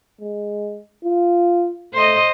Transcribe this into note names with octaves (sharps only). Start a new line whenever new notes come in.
G#3
F4
A3 C5 D#5